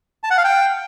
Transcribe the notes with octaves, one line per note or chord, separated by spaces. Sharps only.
A5
F#5
F5
G5